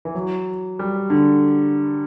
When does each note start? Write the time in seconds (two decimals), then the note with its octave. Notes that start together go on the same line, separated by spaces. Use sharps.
0.05 E3
0.15 F#3
0.79 G3
1.10 D3